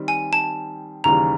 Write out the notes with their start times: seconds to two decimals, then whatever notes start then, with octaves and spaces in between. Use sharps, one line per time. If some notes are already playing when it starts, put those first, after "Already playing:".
Already playing: D#3 G3 C4
0.08 G#5
0.33 A5
1.04 D#2 C#3 E3 G3 A#5